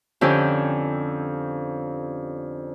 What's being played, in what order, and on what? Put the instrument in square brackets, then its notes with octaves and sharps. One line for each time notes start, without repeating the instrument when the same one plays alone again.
[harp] F2 D3 C#4 G4